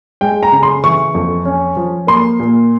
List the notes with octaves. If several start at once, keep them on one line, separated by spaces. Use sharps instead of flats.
G#3 G5
A#5
C#3
C6
E3 C#6
F2
C#4
F3
A#3 C6
A#2